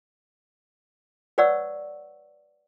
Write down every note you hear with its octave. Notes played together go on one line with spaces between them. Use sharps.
B4 C#5 D5 F#5 C#6 E6